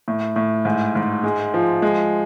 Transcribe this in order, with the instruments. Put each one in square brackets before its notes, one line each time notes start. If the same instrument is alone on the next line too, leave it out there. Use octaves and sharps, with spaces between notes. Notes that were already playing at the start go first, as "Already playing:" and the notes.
[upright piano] A2
A2
G#2
G#2
G#3
F3
G#3